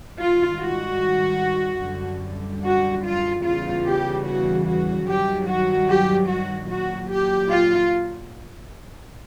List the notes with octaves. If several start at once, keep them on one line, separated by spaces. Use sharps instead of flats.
G#2 D#3 G3 F4
F#4
F#2 D3 G3
F#4
F4
E2 C#3 E3 G3 F4
G4
F#4
F#4
G2 D#3 F#3 G4
F#4
G4
F#4
A#2 F#3 F#4
G4
F4